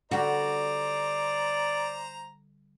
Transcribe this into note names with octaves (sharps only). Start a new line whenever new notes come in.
D3 G3 F#4 C5 D5 A#5